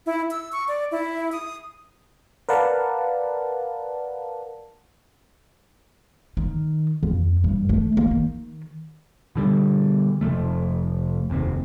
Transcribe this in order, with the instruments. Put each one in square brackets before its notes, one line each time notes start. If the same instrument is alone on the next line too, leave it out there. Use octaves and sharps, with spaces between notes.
[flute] E4
E6
C#6
D5
E4
D#6
[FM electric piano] A#4 B4 D5 F5 F#5 A5
[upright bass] D#3
F2
G2
A3
A#3
D#3
[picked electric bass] B2 D3 G3
F1 C3 F3 A3
F1 D#2 C3